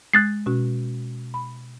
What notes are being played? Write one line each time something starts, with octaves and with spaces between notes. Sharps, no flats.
G#3 D#6 F#6 G#6 A6 C7
B2 C#4 F#4
B5